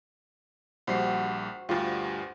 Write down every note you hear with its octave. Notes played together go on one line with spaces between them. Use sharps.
A#1 G3 F#4 C5 C7
D2 G2 F4 G4